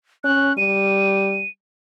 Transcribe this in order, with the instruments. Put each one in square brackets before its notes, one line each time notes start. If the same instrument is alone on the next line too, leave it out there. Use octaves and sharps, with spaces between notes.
[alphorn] C#4 [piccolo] F#6
[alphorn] G3 [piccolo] D#7